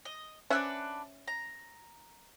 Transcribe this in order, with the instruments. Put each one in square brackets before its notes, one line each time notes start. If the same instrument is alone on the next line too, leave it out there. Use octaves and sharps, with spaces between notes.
[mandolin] D#5
[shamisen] C#4 C5 E5 [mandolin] D4 B4 F#5
[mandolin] A#5